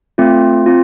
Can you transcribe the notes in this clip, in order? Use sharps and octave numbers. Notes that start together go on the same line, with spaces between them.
A3 C4 F4
C4 F4